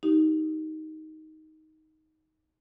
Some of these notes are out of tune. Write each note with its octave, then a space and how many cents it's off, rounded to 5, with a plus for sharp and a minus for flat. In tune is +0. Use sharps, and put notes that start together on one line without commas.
D#4 +10 G4 -10